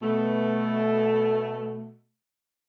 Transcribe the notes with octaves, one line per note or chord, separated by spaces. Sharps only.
B2 A3